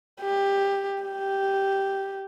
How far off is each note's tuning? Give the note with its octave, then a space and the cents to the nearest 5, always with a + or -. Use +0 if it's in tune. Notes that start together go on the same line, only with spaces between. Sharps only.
G4 +15
G4 -5